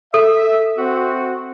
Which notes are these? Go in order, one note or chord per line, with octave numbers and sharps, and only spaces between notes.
A4 E5
C4 F#4